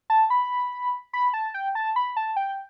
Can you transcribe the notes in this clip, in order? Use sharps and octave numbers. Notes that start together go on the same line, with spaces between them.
A5
B5
B5
A5
G5
A5
B5
A5
G5